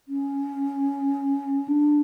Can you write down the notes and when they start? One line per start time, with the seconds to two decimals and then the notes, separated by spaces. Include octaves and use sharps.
0.08 C#4
1.68 D4